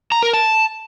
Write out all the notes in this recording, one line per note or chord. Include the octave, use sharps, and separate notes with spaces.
A#5
A#4
A5